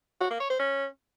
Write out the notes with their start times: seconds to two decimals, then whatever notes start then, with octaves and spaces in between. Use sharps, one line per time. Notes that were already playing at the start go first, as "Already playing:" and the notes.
0.21 F#4
0.30 A#3
0.40 C#5
0.50 C5
0.60 C#4